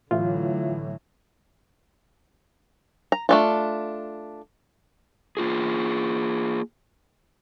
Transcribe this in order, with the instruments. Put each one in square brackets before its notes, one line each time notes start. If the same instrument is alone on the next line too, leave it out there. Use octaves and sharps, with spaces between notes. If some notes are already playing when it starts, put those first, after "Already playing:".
[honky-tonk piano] A2 E3 E4 [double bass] D3 F#3 [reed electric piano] F4
[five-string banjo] A#5
A3 D4 F4
[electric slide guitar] A#3 F4 G#4